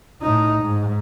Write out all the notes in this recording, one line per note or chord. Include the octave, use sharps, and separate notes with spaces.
A2 D#4
G#2